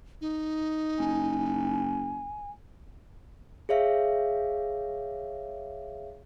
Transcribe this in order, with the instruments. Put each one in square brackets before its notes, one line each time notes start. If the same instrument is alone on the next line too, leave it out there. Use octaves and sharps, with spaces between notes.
[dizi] D#4
[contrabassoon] F#1 [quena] G#5
[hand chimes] G#4 C#5 E5 F5